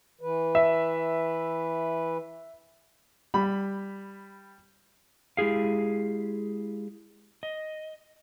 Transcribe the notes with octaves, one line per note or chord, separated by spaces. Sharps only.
E3 B4
E5
G3 B5
G#3 E4 G4 G#4 F5
D#5